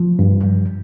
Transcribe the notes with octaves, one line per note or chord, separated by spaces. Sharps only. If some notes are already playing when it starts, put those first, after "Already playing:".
Already playing: F3
G2
G2